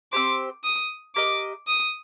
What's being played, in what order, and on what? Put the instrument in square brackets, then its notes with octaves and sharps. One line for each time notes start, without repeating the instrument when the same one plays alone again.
[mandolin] C4 G4 C5 [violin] D6
[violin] D#6
[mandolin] G4 A#4 D#5 [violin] D6
[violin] D#6